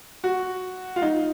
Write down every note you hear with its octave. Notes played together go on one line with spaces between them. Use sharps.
F#4
F4
D#4